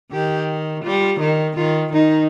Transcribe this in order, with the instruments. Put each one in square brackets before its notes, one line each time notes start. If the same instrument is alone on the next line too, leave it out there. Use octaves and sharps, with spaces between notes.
[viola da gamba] D#3 [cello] G4
[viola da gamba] G3 [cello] F4
[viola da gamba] D#3
[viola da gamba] D#3 [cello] F4
[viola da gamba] D#3 [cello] D#4